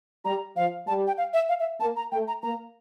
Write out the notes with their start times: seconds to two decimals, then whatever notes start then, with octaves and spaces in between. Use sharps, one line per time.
0.25 G3 A#5
0.56 F3 F5
0.87 G3 A5
1.07 G5
1.18 F5
1.33 E5
1.49 F5
1.60 E5
1.80 A#3 A5
1.96 A#5
2.12 A3 G5
2.28 A#5
2.43 A#3 A#5